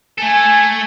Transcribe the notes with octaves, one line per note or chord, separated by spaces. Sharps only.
A3 A4 G#5